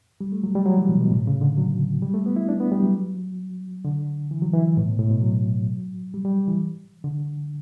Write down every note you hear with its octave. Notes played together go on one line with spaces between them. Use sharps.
G3
A3
F#3
G3
F#3
E3
B2
B2
A2
C#3
D3
F#3
G3
A3
B3
E4
D4
B3
G3
F#3
D3
E3
F#3
E3
A2
B2
A2
B2
F#3
G3
G3
E3
D3